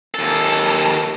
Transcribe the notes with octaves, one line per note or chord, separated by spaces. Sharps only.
D#2 A4